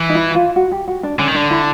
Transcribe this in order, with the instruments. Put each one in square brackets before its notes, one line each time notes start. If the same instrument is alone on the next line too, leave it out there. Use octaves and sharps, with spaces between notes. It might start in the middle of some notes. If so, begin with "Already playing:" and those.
Already playing: [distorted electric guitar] E3
[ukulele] D#4
E4
F4
F#4
G4
F#4
D4
[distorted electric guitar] D3 [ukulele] C#4
[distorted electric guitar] D#3
[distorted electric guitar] D3 [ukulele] D4
[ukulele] E4